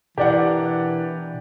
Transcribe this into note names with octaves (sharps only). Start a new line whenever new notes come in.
B2 E3 D4 G4 A#4 D5 F#5